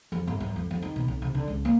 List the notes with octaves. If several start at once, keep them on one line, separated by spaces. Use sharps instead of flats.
F2
G1
F#2
F2
F2
D#3
B2
B1
C3
D3
C#2
A#3